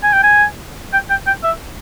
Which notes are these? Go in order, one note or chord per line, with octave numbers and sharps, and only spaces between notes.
G#5
G5
G#5
G5
G5
G5
E5